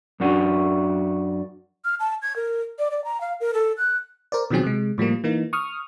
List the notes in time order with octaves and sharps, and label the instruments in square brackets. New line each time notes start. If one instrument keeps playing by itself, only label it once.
[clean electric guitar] F#2 C#4 D4 F#4
[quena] F6
A5
G#6
A#4
D5
D5
A#5
F5
A#4
A4
F#6
[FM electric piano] A#4 C5 D5
B2 D#3 F3 F#3 C4 G#4
C3 G#3
A2 F3 G3 A#3
E3 A#3 D#4
C#6 D#6 F6